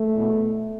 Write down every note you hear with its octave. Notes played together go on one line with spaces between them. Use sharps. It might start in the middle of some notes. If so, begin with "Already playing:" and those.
Already playing: A3
E2 B2